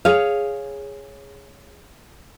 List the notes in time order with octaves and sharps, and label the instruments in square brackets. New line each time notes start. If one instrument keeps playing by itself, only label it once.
[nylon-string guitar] G#4 C#5 F5